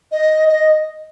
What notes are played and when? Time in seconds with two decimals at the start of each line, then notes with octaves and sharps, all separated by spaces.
0.12 D#5
0.49 D#5